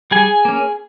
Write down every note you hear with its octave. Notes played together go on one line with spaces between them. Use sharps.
G3 G#4 G#5
A#3 C#4